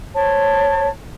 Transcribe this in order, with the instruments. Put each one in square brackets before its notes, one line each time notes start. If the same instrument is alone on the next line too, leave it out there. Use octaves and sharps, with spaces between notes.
[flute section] C5 C#5 A5